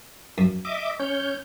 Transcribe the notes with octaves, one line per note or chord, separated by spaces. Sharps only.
F#2
D#5 E5 D6
C#4 C#5 G6